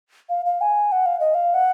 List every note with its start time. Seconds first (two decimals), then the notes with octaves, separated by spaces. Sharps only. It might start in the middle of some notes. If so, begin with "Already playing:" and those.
0.29 F5
0.46 F5
0.61 G#5
0.92 F#5
1.06 F5
1.20 D#5
1.34 F5
1.54 F#5